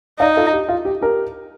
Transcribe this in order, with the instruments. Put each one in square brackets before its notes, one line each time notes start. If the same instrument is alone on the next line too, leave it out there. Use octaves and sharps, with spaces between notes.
[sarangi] D#4 [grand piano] D5 F5
[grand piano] F4 A4
G4
F4
G4
G4 A#4